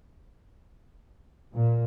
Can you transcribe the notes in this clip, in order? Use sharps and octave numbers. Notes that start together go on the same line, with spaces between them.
A#2